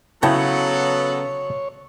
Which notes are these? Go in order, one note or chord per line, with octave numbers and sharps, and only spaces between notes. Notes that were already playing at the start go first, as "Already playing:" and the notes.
C#3 F#3 B3 E4 A4 C#5 G5 A5